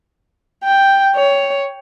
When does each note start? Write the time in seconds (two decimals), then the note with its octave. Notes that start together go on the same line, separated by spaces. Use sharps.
0.64 G5
1.15 C#5